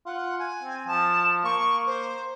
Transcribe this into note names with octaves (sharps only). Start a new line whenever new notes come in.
F4 F#5
G#5
C4
F3 A5
A#3 C#6
C5